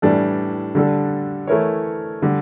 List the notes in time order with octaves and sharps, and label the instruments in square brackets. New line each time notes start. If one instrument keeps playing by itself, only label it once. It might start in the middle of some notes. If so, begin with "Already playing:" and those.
[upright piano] A2 E3 G3 D4 A4
D3 G3 D4 A4
E3 A3 E4 A#4 C#5
D3 G3